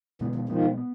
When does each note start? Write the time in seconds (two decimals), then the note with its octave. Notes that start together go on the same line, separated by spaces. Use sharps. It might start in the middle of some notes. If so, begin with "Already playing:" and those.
0.21 B2 D3 E3 G#3 B3
0.35 D#3 F3
0.49 B2 D#3 F3 G#3 B3
0.77 B3